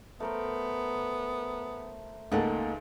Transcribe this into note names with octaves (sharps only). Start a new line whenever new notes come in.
A3 B3 A#4 C5
C#2 A3 A#3 D#4 A4 F#5